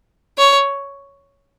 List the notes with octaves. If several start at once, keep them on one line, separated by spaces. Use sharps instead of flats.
C#5